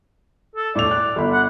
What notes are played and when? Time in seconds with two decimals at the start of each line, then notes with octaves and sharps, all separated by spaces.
0.56 A4
0.75 A2 D5 F7
0.91 F#6
1.16 G1 B5
1.33 F#5